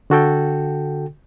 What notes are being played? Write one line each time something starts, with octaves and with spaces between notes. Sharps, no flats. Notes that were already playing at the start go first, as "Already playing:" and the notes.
D3 F#4 A4 G5